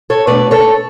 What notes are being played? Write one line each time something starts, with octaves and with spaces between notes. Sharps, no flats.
A4 C#5
B2 A3 D4 B4 D5
A4 C#5